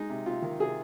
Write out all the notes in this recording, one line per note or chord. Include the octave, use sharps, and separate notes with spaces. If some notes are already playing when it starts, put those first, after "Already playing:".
Already playing: G#3 D#4
C3
C3 F4
D#3
C3 G#4